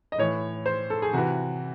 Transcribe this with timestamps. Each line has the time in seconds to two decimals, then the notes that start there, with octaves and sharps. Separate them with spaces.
0.12 D#5
0.18 A2 E3 C#5
0.66 C5
0.90 A4
1.02 G#4
1.13 C3 E3 F#4